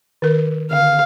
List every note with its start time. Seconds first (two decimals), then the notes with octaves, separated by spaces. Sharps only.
0.22 D#3 A#4
0.71 D3 F5